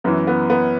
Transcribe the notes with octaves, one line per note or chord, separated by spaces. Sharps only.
F#2 E3 B3
B3
B3